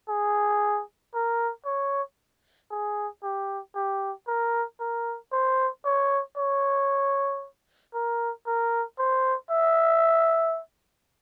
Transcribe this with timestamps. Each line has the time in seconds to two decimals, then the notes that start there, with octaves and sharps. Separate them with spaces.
0.09 G#4
1.15 A#4
1.66 C#5
2.71 G#4
3.23 G4
3.75 G4
4.28 A#4
4.80 A#4
5.33 C5
5.85 C#5
6.37 C#5
7.94 A#4
8.47 A#4
8.99 C5
9.51 E5